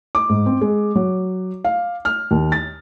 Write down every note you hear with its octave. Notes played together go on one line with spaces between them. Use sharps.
D6
G#2
C4
G#3
F#3
F5
F6
D#2
A6